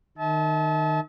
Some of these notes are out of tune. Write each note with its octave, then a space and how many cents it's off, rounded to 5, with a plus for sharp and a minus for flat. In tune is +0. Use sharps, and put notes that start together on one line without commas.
D#3 -20 E5 -45 A5 -30